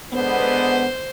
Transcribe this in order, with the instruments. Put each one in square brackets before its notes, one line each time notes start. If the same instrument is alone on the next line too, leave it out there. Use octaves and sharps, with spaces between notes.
[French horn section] D3 G#3 B3 [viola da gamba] C5